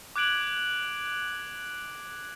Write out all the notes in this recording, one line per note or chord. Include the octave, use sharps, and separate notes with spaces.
D6 F#6 G#6 D7 F#7